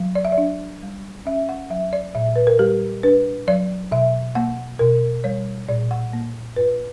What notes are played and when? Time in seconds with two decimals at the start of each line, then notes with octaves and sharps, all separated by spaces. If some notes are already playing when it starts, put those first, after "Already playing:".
Already playing: F#3
0.15 D5
0.25 E5
0.32 D5
0.38 D4
0.82 G3
1.26 C#4 E5
1.49 F#5
1.70 F#3 E5
1.93 D5
2.15 A#2 E5
2.36 B4
2.47 A#4
2.59 G3 G4
3.03 D4 B4
3.48 F#3 D5
3.92 B2 E5
4.35 A#3 F#5
4.79 B2 A#4
5.24 G3 C#5
5.68 A#2 D5
5.91 F#5
6.13 A#3
6.56 G2 B4